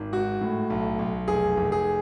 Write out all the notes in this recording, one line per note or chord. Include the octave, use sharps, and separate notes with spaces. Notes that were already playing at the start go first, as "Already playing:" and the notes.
Already playing: G#1
G#2 F#4
A2
B1
B1
F1 G#4
F1
G#4